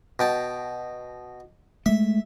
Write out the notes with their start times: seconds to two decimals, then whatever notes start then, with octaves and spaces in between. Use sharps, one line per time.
0.19 B2 G5 A5
1.86 G#3 A3 E5